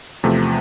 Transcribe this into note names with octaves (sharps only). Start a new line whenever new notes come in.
E2 C3 F3 A3